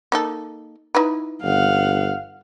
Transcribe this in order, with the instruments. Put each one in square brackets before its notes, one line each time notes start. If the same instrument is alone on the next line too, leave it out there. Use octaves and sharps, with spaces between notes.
[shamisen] A#3 D#4 A4
D#4 E4 B4
[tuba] G1 [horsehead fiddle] F5 F#5